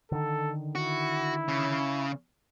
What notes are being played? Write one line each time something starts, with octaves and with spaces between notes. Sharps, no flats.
D3 D#3 A4
E4 F#4
C#3